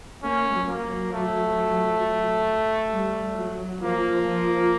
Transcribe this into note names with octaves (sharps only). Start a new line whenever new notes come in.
A#3 C#4
F#3
A#3
F#3
A3
G3
F#3
F3 A#3
F3